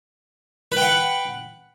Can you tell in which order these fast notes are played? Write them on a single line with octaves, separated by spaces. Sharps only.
B4 G5 F#5